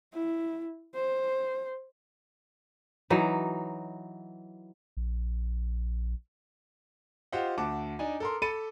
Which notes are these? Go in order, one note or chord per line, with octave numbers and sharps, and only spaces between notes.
E4
C5
E3 F#3 D#4
A#1
F4 G4 C5 D#5 F5 F#5
D2 F#5 A5 D6
D4 D#4 G#5
A4 A#4 C6
A4 B5 A6 C#7 D#7